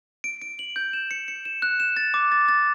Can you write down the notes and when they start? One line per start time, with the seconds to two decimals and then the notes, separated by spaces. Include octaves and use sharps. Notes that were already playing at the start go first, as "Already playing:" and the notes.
0.24 D7
0.42 D7
0.59 F#7
0.76 G6
0.93 E7
1.11 C#7
1.28 C#7
1.45 E7
1.62 F#6
1.80 E7
1.97 A6
2.14 D6
2.32 A6
2.48 A6